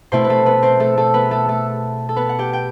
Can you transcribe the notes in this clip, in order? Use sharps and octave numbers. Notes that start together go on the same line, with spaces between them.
B2 A3 C4 E4 C5
B4
A3 A4
B3 B4
C4 C5
A3 A4
A3 A4
B3 B4
A3 A4
A3 A4
A4
B3 B4
F#5
G4 G5
G5